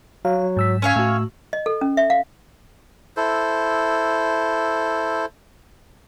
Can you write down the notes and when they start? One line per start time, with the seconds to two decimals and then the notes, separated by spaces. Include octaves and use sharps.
0.25 F#3 F5
0.57 G#2 E6 B6
0.82 C#4 C#5 F5
0.96 A2 A3 F#4 E6
1.53 D#5
1.66 A4
1.81 C#4
1.97 E5
2.10 F5
3.17 E4 A4 C5